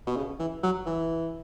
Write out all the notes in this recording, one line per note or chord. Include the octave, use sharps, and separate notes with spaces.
B2
C#3
E3
F#3
E3